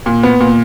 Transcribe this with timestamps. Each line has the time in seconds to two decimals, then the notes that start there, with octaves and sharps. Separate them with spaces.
0.06 A#2
0.23 B3
0.40 A#2